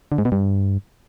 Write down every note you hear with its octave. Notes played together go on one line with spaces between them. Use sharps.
D3
G#2
B2
G2